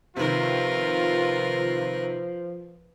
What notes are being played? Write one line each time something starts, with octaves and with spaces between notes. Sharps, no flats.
C3 D#3 F3 F4 A#4 B4